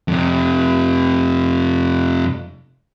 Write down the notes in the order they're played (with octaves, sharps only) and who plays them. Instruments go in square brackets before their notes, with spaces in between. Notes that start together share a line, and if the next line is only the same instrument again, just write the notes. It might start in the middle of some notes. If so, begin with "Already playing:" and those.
[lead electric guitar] F2 C3